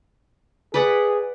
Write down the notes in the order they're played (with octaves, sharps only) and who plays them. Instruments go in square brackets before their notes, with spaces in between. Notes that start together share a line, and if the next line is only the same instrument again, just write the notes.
[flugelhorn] G#4 [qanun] B4 D5 F#5